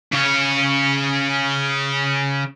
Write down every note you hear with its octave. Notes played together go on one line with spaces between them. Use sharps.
C#3 C#5